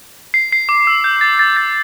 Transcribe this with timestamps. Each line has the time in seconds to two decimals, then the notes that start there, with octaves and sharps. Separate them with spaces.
0.34 C7
0.52 C7
0.69 D6
0.87 E6
1.04 G6
1.21 A6
1.39 A6
1.57 A6